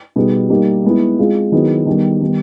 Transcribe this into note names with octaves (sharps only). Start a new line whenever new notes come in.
B2 G3 B3 D#4 G#4
G3 A#3 D#4 G4
G#3 B3 E4
G#3 C4 F4 G#4
D#3 F#3 B3 E4 G#4
D#3 G3 B3
D#3 G3 B3